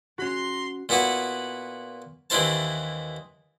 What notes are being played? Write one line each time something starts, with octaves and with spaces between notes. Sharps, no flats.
C#4 F#4 A#5 C6
A#2 B3 E4 F#4 B5
D#2 E3 D4 E4 C5 A5